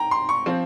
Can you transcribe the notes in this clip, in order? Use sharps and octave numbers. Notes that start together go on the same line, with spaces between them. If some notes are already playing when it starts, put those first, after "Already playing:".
Already playing: G5 A#5
C6
C#6
F3 C4